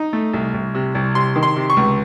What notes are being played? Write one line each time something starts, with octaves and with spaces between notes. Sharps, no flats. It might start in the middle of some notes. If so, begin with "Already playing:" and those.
Already playing: D#4
A3
C2
C2
C3
C2
C3 C6
D#3
C6
C3
C#6
C#2